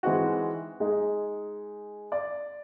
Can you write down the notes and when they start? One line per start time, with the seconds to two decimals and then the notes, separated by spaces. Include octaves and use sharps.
0.03 E3 G#3 C4 D#4 F#4
0.80 G#3 D#4 G#4
2.12 D5